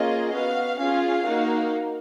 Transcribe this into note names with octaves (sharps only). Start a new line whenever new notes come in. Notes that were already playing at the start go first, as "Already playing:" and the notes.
Already playing: A#3 C#4 F4 G#4 D#5
B3 F#4 F5
C#4 F4 G#4 F5
A#3 D#4 F#4